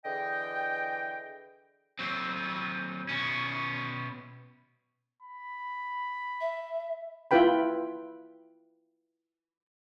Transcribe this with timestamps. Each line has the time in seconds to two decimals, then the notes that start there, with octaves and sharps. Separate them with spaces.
0.05 D3 E3 G#4 D#5 G5
1.99 F#3 C4
3.09 B2 C#4
5.22 B5
6.40 E5
7.31 E4 F4 B4 G5 B5